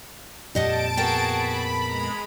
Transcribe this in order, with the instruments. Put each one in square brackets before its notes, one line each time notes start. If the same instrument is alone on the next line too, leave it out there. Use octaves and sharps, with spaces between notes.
[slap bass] F2 A#2 [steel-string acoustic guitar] G3 D#5 F#5 [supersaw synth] A5 D7
[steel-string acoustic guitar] B3 A#4 G5 [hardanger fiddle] F#4 G#4
[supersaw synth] B5
[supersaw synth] G#3 [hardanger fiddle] A#5 B5